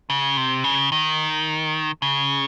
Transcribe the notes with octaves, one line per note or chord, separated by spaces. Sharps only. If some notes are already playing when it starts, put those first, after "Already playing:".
C#3
C3
C#3
D#3
C#3